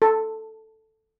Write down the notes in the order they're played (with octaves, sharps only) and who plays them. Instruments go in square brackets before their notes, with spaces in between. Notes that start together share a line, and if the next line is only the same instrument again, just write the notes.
[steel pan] A4